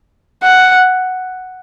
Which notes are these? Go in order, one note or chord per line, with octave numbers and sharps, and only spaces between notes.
F#5